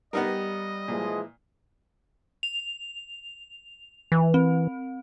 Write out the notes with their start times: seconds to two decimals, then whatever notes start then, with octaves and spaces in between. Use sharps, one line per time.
0.13 G3 B3 D#4 A#4 D#5
0.88 A#2 E3 F3 G#3
2.43 F7
4.12 E3
4.34 C4